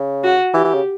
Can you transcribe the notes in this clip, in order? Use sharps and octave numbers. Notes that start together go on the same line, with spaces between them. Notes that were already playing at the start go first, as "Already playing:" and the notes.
Already playing: C#3
F#4
E3 G4
E3
C#3